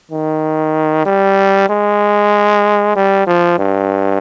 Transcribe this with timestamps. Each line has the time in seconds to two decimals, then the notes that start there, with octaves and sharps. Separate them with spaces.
0.11 D#3
1.06 G3
1.70 G#3
2.96 G3
3.27 F3
3.59 G2